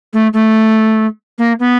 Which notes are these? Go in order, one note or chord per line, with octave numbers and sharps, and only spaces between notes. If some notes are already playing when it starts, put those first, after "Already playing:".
A3
A3
A#3
B3